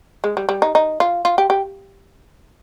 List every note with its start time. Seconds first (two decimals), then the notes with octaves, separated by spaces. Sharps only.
0.24 G#3
0.37 G3
0.49 G3
0.62 D#4
0.75 D#4
1.00 F4
1.25 F4
1.38 G4
1.50 G4